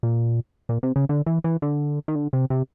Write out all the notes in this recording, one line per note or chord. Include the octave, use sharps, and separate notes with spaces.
A#2
A#2
C3
C#3
D3
E3
E3
D3
D#3
D3
C3
C3